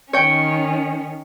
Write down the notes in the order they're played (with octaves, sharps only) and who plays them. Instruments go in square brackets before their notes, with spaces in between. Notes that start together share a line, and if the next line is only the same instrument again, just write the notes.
[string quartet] D#3 C#4 [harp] C#5 G5